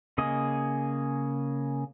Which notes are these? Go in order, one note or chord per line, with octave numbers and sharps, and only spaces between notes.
C#3 A#3 G#4 D#5